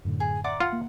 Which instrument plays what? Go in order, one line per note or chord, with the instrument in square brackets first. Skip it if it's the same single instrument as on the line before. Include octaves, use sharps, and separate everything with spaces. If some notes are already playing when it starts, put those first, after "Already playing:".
[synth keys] F#2 A2 D3
[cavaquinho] G#4
[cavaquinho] D5 F#5 D6 [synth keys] E5 A#5 C6
[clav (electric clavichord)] F4 [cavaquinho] F#5
[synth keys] A#3